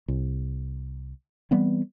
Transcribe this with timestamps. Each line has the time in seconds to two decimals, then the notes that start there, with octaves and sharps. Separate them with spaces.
0.08 C2
1.51 E3 G3 B3 C4